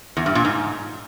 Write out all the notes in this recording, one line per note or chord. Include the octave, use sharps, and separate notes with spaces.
E2
G2
A#2
G#2